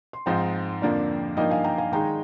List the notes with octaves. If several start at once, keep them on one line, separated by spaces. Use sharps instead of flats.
C6
G#2 F3 C4 D#4 G5 A#5
F2 D3 F3 A#3 D4 D5 F5
G2 F3 A#3 D#4 D#5 G5
F5 G#5
G5 A#5
F5 G#5
D#3 G#3 D#4 G5 A#5